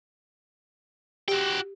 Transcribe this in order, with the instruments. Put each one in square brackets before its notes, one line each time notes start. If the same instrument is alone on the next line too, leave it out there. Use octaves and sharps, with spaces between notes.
[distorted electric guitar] F#4 G5 [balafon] G4